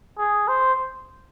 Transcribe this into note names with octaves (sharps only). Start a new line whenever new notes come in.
G#4
C5